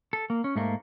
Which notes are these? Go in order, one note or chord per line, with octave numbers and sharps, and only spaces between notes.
A4
A#3
C#4
G#2 A3 A#3